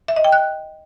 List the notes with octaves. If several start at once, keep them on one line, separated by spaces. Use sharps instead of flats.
E5
D#5
G5
F#6